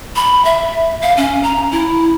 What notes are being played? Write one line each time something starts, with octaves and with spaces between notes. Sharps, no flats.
B5
E5
F5
C#4
A#5
E4